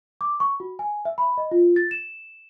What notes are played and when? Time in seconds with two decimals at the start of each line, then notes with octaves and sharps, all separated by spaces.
0.21 D6
0.40 C#6
0.60 F#4
0.79 G#5
1.05 E5
1.18 B5
1.38 D#5
1.51 F4
1.76 A6
1.91 E7